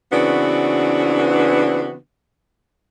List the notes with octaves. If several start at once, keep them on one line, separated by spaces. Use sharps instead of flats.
C#3 E3 B3 C4 D4 F#4